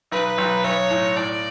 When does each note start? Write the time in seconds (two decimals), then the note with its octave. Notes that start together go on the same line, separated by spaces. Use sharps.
0.12 B1 B4
0.38 B1
0.64 B1 C#5
0.91 A2
1.17 A2 D5